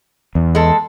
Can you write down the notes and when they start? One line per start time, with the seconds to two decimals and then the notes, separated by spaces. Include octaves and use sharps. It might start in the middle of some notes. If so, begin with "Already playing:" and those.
0.35 E2
0.55 G#3 A4